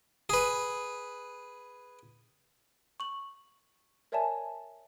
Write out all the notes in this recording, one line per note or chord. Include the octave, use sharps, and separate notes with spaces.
G#4 B4
C#6 F#7
A#4 C#5 D5 E5 G#5 A5